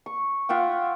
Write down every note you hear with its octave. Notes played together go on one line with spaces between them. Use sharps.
C#6
F4 E5 F#5 G5